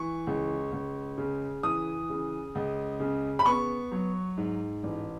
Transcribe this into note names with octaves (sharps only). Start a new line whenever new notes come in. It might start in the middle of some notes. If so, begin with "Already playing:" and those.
Already playing: E3 C#6
C#2
C#2
C#3
E3 D#6
C#3
C#2
C#3
B5
B3 C#6
F#3
G#2
A1